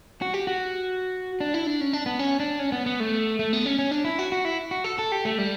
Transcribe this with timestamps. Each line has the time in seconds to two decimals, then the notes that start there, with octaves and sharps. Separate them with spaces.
0.22 F#4
0.34 G4
0.47 F#4
1.40 D4
1.54 E4
1.67 D4
1.81 C#4
1.93 D4
2.06 B3
2.19 C#4
2.40 D4
2.59 C#4
2.72 B3
2.86 B3
3.00 A3
3.39 A3
3.53 B3
3.66 C#4
3.79 C#4
3.91 D4
4.05 E4
4.19 F#4
4.32 F#4
4.45 E4
4.71 F#4
4.84 A4
4.99 A4
5.12 G4
5.25 A3
5.38 G3